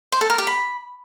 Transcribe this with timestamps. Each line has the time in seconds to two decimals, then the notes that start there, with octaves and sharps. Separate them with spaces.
0.12 C5
0.21 A4
0.30 A#4
0.38 G4
0.47 B5